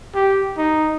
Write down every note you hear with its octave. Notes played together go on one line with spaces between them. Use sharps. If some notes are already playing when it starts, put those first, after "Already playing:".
G4
D#4